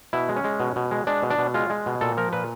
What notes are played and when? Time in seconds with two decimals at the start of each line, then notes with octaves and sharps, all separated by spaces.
0.13 B2 E4
0.29 G#3
0.36 C#4
0.44 G#3
0.60 B2
0.76 B2
0.91 G#3
1.07 G#3 D4
1.23 B2
1.30 D4
1.38 B2
1.54 G#3 F4
1.70 G#3
1.86 B2
2.01 A#2 A4
2.17 F3 A#4
2.33 A#2 B4